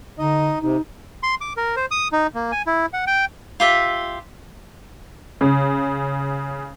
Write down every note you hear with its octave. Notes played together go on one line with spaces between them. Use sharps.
D3 D#4 D#5
C3 D#4
C6
D6
A#4
C5
D#6
D#4
A#3
G#5
E4
F#5
G5
F4 G4 E5
C#3